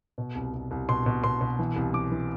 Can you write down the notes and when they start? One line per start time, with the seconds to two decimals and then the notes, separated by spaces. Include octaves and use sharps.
0.18 B2
0.35 C2
0.53 C2
0.71 C2
0.89 B2 C6
1.06 B2
1.24 B2 C6
1.41 B2
1.59 E3
1.76 C2
1.94 E3 D6
2.12 E3